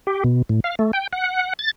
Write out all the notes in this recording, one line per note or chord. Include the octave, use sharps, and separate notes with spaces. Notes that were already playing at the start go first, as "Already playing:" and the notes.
G4
B2
A2
F5
A3
G5
F#5
A6